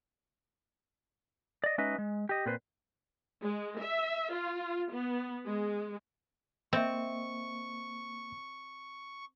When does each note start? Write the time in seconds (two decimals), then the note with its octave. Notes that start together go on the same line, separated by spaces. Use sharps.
1.64 D5 D#5
1.78 G#3 C#4 D#4 B4 D#5 E5
1.98 G#3
2.29 G4 D#5
2.46 A#2 C4 B4 C5
3.43 G#3
3.81 E5
4.34 F4
4.93 B3
5.46 G#3
6.73 A#3 C4 D#5 E5 C#6